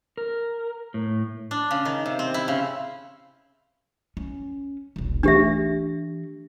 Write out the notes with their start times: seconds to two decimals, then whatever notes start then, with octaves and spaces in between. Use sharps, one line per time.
0.17 A#4
0.94 A2
1.51 D4
1.71 C#3
1.85 D#3
2.06 C3
2.19 C4
2.34 E4
2.48 C#3
4.17 C#4
4.96 E1 B1
5.23 E3 A3 D4 G4 E5